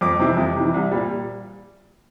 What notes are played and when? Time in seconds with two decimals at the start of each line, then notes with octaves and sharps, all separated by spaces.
0.01 F2 D6
0.19 C3 E3
0.37 F2
0.56 C3 E3
0.74 C2
0.91 A#2 G3